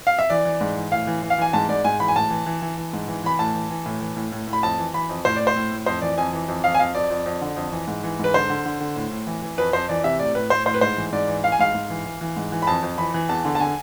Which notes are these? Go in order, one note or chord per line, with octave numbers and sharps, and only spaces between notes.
F5
E5
E3 D5
E3
G#2
E3
A2 F5
E3
E3
F5
E3 G#5
G#2 A5
G#2 D5
G#2 G#5
E3 B5
G#5
A2 A5
E3
E3
E3
E3
G#2
E3
E3 B5
A2 A5
E3
E3
A2
E3
A2
A2
A2
B5
F2 A5
E3
E3 B5
F2
A2 C5
A2 D5
C5
A2
A2
F2 C5
E3 D5
F2 G#5
E3
F2
F2 F5
G#5
F2 F5
F2 D5
F2
F2
D3
F2
E3
G#2
E3
G#2 B4
D3 C5
D3
D3
D3
A2
A2
E3
E3
F2 B4
F2 C5
E3 D5
C3 E5
A2 D5
A2 B4
A2 C5
A2 C5
B4
G#2 C5
E3
G#2 D5
E3
E3 F5
G#5
G#2 F5
G#2
E3
E3
E3
G#2
E3
B5
F2 A5
F2
E3 B5
E3
E2 A5
D3
A5
D3 G#5